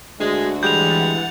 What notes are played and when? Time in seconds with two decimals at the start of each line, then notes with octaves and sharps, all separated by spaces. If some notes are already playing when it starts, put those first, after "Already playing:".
0.20 D2 G#3 F#4
0.63 E3 G3 G#3 F#5 G6 A6 F7